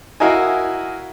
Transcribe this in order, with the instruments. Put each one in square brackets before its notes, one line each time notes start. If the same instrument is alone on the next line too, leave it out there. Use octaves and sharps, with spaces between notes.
[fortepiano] E4 F#4 A#4 D#5 F5 G#5